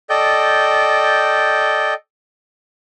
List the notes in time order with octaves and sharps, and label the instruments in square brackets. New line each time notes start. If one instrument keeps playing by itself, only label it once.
[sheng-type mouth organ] A4 D5 D#5 G5 G6